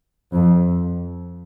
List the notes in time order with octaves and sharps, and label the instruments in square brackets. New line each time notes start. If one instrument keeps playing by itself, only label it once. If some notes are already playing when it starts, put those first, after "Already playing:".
[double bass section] F2